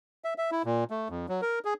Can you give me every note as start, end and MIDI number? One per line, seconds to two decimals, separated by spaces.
0.24 0.34 76
0.38 0.51 76
0.52 0.62 64
0.65 0.84 46
0.90 1.08 57
1.10 1.26 41
1.29 1.41 54
1.42 1.59 70
1.65 1.74 68